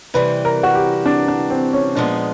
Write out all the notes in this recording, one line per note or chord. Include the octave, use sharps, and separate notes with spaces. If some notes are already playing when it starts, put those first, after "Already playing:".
C3 E3 G3 B4
A#4
F#4
G4
D4
D4
C4
C#4
A#2 F3 G#3 B3 D4